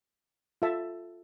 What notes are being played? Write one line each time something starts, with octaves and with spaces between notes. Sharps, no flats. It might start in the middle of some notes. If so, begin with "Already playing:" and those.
F4 A4 E5 A5